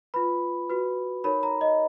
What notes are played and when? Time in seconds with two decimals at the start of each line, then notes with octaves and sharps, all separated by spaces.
0.14 F4 B4 B5
0.69 F#4 B4
1.24 D#4 A#4 C#5 B5
1.43 A#5
1.61 D#5